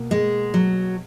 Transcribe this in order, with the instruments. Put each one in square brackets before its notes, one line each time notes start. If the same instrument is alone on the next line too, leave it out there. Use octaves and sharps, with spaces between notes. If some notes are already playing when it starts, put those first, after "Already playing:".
Already playing: [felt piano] B2 A#3
[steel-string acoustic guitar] G#3
F#3